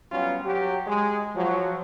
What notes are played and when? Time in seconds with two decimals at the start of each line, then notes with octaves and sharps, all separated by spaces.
0.12 F#3 G3 B3 C#4 F4
0.45 F#3 G4
0.87 G#3
1.35 F3 F#3